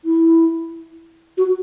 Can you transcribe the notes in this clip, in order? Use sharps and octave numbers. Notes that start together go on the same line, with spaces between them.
E4
F#4